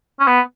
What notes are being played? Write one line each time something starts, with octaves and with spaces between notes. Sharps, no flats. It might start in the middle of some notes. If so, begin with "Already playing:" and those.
C#4
B3